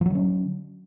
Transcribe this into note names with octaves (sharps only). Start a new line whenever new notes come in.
D3 F3 F#3 C#4